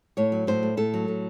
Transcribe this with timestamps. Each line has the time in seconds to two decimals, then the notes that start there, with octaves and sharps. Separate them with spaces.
0.17 A2 C#5
0.32 F#3
0.47 A2 C5
0.63 A3
0.77 A2 A4
0.94 F#3
1.08 A2